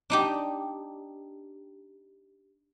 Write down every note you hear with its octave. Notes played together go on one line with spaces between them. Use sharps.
D4 D#4 G4